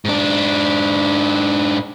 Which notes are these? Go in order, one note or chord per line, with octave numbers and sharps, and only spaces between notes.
G#2 D4